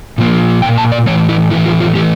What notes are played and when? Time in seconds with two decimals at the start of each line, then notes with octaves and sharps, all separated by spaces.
0.18 A#2 F3 A#3
0.62 A#2 F3 A#3 G5
0.78 A5
0.92 D5
1.06 A2 E3 A3 C#5
1.29 E4
1.50 A2 E3 A3 E4
1.66 F4
1.80 F4
1.95 A2 E3 A3 G4